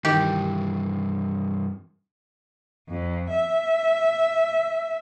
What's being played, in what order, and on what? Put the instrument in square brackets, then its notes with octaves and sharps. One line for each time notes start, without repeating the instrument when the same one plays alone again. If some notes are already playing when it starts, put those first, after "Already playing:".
[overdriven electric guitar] G2 E3 [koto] D#3 G4
[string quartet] F2
E5